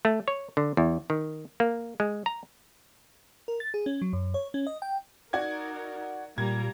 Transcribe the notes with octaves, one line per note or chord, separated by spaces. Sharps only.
A3
C#5
D3
E2
D#3
A#3
G#3
A#5
A#4
A6
G#4
C#4
F#3
F#2
C#5
C#4
D#5
G5
D#4 F#4 A#4 D5 G#6
A#2 G3 A#3 A#5 G#6